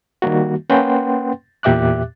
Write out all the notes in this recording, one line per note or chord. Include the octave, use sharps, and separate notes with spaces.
D#3 G3 A#3 F#4
A#3 C#4 B4 F#5 G5 C6
E2 A#2 G4 E5 D6 F#6